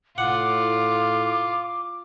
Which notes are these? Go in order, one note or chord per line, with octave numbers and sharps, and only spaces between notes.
A2 F4 F#5 D6